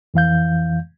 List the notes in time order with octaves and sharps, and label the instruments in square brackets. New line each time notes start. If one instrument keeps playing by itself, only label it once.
[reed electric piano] F2 E3 F5 G6